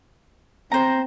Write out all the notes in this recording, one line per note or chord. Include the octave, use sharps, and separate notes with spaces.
C4 C5 A#5